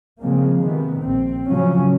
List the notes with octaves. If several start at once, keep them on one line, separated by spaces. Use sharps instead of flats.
C#3 F3 G#3 A#3 C4
C3 D#3 B3
A#1 C4
A2 C#3 F3 F#3 C#4